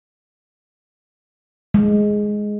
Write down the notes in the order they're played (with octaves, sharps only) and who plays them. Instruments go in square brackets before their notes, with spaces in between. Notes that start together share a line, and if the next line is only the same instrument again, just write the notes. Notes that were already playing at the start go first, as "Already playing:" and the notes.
[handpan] G#3